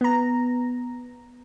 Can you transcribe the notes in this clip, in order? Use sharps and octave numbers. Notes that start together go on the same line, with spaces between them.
B3 A#5